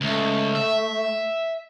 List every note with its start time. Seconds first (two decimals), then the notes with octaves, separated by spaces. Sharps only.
0.01 C#2 A3
0.55 E5